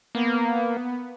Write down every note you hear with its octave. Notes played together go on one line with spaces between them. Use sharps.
A#3 B3